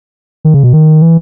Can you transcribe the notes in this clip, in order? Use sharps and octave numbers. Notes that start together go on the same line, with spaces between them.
D#3
C#3
B2
D#3
E3